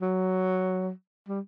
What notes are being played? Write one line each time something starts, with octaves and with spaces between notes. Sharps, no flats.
F#3
G3